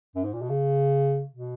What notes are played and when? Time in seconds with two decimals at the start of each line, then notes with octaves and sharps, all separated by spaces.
0.15 F#2
0.24 G#2
0.33 A#2
0.42 B2
0.49 C#3
1.32 B2